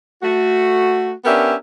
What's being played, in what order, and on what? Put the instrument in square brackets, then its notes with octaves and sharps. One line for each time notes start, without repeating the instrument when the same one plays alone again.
[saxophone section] A3 F#4
B3 C#4 D4 G4 A#4 E5